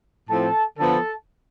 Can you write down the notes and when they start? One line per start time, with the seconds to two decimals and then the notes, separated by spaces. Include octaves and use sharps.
0.30 A2 F3 C4 A4 A5
0.78 D3 F3 B3 A4 A5